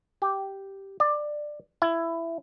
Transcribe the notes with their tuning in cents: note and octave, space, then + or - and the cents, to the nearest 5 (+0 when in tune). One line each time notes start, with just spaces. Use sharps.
G4 -5
D5 +15
E4 +15